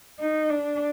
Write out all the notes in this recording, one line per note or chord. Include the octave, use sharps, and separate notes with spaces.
D#4
D4